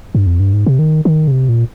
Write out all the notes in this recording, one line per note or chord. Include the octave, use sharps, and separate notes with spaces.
G2
F2
G2
G#2
C3
D#3
D#3
C#3
C3
A#2